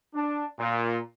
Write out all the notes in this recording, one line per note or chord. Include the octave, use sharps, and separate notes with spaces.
D4
A#2